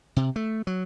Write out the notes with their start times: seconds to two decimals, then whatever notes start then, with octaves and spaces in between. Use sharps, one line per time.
0.16 C3
0.36 A3
0.67 F#3